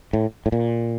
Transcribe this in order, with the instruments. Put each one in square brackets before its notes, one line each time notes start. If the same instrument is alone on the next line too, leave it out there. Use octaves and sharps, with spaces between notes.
[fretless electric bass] A2
A2
A#2